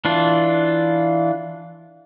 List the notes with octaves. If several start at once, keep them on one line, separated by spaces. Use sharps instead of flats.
E3 D4 F4